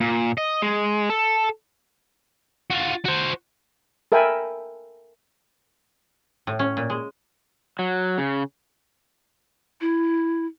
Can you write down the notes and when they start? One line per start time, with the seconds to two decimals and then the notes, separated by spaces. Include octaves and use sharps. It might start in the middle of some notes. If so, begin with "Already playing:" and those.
0.01 A#2
0.38 D#5
0.62 G#3
1.10 A4
2.71 F4 F#4
3.05 F#4 C5
4.12 A4 A#4 E5 G5 G#5 B5
6.47 A2
6.59 C#4
6.77 A#2
6.90 G#3
7.79 F#3
8.18 C#3
9.81 E4